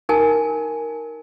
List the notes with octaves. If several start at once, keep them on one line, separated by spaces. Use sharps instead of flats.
D#4 A#4 G#5 A5